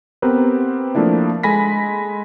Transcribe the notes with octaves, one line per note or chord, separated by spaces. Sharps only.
B3 C4 G4 A#4 B4
F3 A3 A#3 D4 E4
G#3 A4 G#5 B5 A#6 B6